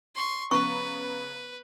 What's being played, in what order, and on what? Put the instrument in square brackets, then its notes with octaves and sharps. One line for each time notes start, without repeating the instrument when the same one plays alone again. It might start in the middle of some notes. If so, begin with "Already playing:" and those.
[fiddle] C6 C#6
[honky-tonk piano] C#3 B3 A#5 [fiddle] B4 [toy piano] C#6